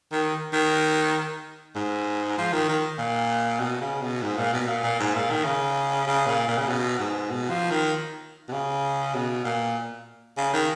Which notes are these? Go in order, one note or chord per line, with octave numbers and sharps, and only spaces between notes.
D#3
D#3
G#2
F3
D#3
D#3
A#2
B2
C#3
B2
G#2
A#2
B2
A#2
A#2
G#2
A#2
D#3
C#3
C#3
A#2
A#2
C#3
B2
G#2
B2
F3
D#3
B2
C#3
B2
A#2
C#3
D#3